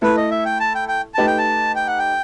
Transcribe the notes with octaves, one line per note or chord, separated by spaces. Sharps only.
A3 E4 A4 B4
D#5
E5
G5
A5
G5
G5
A3 D#4 G4 B4 A5
G5
A5
G5
F#5
G5